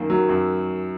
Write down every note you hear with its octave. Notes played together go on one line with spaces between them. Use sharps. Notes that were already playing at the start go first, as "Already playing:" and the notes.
Already playing: F#2 D#3 A#3
F#3
F#2